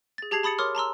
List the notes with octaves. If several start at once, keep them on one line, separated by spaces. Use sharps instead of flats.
G#4 A6
G4 G#4 A5 G#6 C7 F7
A5 B5 D#6 A6 C#7
A#4 C#5 C6 D6 D#6 F6
A5 A#5 C6 E6